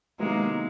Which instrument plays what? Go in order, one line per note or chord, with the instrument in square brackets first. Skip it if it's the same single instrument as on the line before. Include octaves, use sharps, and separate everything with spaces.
[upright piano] C3 D#3 F#3 B3 E4 [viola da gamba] G#3 A#3